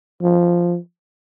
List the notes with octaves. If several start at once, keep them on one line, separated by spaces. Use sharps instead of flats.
F3